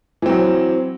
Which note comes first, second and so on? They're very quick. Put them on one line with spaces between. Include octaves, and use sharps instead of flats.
E3 C4 F#3